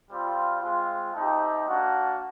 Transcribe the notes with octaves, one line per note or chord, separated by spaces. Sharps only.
G3 C4 F4
G#3 C4 F4
A3 C4 D#4 G4
A#3 D4 F#4